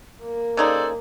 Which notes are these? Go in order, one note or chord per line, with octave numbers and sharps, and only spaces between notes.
A#3
C#3 D#4 G#4 A4 C5 D5